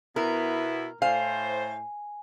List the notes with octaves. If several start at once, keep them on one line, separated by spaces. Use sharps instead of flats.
B2 B3 E4 A#4
A2 C5 F5 G#5